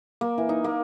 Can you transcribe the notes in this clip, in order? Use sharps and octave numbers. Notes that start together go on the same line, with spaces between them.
A#3
E3
D#4
A#3